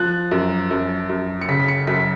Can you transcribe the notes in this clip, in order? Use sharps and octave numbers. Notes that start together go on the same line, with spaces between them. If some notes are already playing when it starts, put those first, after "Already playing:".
Already playing: F3 F#6
F#2
F#2
F#2
C#7
C#3 B6
B6
C#7
F#2 B6